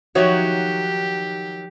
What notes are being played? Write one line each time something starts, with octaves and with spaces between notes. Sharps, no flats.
D#3 F3 F#3 D#4 F#4 G4 C#5 E5